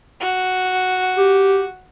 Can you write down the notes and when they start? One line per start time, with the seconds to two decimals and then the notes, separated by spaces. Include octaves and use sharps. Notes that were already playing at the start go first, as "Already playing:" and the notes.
0.20 F#4
1.17 G4